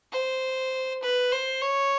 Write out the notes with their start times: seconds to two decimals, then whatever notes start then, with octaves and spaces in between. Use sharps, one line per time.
0.12 C5
1.02 B4
1.32 C5
1.62 C#5